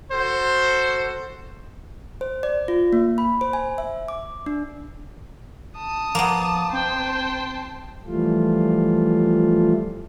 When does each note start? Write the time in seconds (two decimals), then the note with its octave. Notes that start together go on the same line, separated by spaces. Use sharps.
0.12 F#4 A4 C5
2.21 C5
2.43 D5
2.68 F4
2.93 A#3
3.18 B5
3.41 C5
3.53 G#5
3.78 E5
4.08 D6
4.46 D4
5.78 A5 D#6
6.15 F3 A#3 B3
6.73 C4 C5 G5 A5
8.07 E3 F3 G3 A3 F4